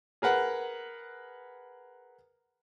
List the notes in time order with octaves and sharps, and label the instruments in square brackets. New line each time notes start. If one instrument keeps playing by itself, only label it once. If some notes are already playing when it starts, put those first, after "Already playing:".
[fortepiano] G#4 A#4 B4 F#5